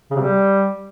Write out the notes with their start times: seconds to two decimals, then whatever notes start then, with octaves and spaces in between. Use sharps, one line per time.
0.11 C#3
0.16 C3
0.21 G3